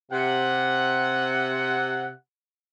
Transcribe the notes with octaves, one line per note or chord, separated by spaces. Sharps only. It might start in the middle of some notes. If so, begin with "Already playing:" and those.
C3 F#5